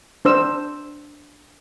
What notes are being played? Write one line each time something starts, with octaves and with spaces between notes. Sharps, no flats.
D4 C5 E6